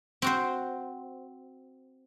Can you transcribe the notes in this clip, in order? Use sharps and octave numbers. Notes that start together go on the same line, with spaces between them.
C4 F#4 C5